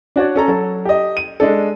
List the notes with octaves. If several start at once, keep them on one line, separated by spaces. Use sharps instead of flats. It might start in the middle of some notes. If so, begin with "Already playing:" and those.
D4 F#4 C#5 D5
C#4 A4 A#5
F#3 A4
G4 D#5
D#7
G#3 D4 A4